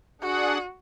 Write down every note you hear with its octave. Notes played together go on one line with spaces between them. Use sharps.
D4 F#4 G#4 F#5